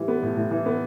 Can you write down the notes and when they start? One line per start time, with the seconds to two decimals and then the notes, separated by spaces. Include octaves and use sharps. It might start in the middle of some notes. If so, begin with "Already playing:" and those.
Already playing: A2 E3 G3
0.08 B3
0.22 A2
0.36 A2
0.51 E3
0.66 B3